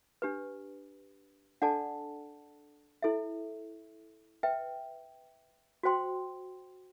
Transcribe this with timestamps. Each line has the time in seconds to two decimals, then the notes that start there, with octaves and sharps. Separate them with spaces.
0.22 D4 G4 B4
1.62 D4 A4 D5 F#5 A5
3.02 E4 A4 E5
4.43 B4 E5 G5
5.83 F#4 C5 G5 C6